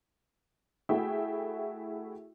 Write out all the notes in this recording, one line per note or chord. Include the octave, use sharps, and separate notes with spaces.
A3 E4 F#4 G#4 E5 G5